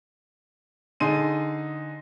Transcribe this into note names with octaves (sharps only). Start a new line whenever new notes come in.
D3 D#4 G#4 C6 D#7